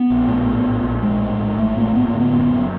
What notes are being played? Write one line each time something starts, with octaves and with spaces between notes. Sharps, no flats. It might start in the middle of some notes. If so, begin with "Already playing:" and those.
Already playing: B3
A#1
A2
A2
A#1
A#1
A2 G#3
A2
A#1
A#1 A3
A2 A#3
A2 B3
A#3
D3
B3
F#1
F#2